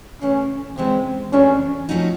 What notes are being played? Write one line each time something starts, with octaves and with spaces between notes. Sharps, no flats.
C#3 E3 A3 C#4
C#3 E3 G#3 C4
E2 C#3 F#3 A3 C#4 D4
F3 A3 C4 D#4 F#4